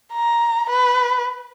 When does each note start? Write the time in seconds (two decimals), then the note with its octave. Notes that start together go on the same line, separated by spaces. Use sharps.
0.13 A#5
0.70 B4